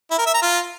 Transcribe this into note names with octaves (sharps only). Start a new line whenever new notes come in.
E4
A#4
E5
A#5
F4